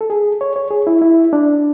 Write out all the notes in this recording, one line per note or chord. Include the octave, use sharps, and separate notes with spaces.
A4
G#4
C#5
C#5
G#4
E4
E4
D4